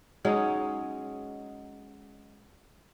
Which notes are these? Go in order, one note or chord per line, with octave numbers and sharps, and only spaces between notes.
F#3 G#3 C#4 D#4